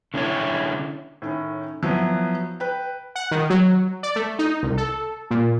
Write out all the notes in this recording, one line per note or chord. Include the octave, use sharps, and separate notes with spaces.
D3 C#4 E4 C#5
A2 D#3 C#4
F3 F#3 B3 E4
B4 G5
F#5
D#3
F#3
D5
A3
D#4
C2
A4
A#2